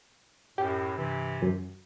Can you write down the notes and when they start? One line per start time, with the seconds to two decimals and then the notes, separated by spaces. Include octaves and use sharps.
0.58 F#2 A2 G4
0.97 G2 C3 E3
1.42 F#2